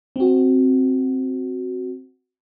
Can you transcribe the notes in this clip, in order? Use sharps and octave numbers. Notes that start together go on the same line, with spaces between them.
C4 F#4